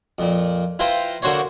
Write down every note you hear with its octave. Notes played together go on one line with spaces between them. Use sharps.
F2 A#2
E4 F4 B4 C5 G5 A#5
D3 A#3 D4 F#4 C5 C#5